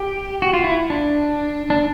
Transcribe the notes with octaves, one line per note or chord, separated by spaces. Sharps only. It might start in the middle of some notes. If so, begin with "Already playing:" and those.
Already playing: G4
F#4
F4
E4
D4
D4